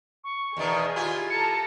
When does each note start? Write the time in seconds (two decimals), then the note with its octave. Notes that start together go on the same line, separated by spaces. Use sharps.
0.24 C#6
0.57 E2 B2 D#3 G#4
0.96 E4 F4 G4 G#5
1.30 A4 A5 A#5 C#7